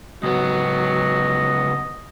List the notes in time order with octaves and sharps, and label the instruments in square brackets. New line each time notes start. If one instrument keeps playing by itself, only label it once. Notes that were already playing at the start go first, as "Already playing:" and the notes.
[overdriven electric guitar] C#2 B3 [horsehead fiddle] F#3 [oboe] D#5